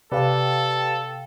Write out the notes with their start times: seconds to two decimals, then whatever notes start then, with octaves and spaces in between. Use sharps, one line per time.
0.12 C3 G4 A4 B4 D5 F5 G5